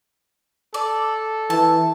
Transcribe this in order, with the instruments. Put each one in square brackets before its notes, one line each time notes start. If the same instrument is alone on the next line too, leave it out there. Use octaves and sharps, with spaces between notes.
[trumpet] A4 [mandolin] D5
[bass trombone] E3 [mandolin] A5